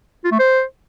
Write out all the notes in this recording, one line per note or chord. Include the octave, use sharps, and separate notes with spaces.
F4
A3
C5